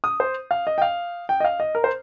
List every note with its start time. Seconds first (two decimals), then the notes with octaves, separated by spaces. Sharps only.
0.04 D#6
0.20 C5
0.51 F5
0.67 D#5
0.78 G5
0.82 F5
1.29 G5
1.40 D#5
1.44 F5
1.60 D#5
1.75 A#4
1.84 C5